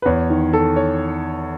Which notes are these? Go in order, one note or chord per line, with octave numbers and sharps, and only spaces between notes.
B4
E2 C#5
D#3
D#3 A4
C#5